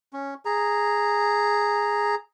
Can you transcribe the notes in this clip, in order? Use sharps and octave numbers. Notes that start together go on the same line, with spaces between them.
C#4
G#4 A#5